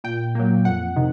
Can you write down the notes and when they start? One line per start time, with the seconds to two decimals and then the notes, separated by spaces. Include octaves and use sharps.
0.04 A#2 G5
0.35 F#3 A#3
0.65 F2 F#5
0.96 C3 D#3